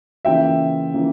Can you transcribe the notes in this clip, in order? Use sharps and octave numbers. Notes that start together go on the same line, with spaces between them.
C#3 E3 A#3 F4 E5 G5
C#3 E3 A#3 F4